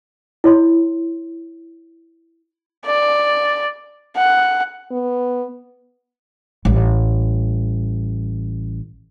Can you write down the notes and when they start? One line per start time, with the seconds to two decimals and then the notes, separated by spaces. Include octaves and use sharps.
0.44 E4 C#5 C6
2.85 D5
4.16 F#5
4.92 B3
6.65 A1 G3